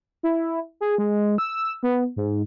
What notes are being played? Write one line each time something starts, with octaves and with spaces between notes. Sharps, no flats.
E4
G#4
G#3
E6
B3
G#2